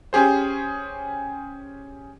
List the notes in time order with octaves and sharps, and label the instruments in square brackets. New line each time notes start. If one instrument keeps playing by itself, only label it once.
[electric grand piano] C#4 G4 G#4 C5